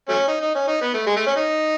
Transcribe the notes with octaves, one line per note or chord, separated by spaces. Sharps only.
F#3 A3 C#4
D#4
D#4
C#4
D#4
B3
A3
G#3
A3
C#4
D#4